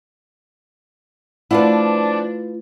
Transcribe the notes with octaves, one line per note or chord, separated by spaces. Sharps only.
F3 A3 D4 E4 F4 B4 D5 F#5